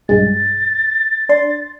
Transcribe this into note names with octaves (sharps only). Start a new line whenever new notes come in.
B1 G2 G#3 A6
D4 C6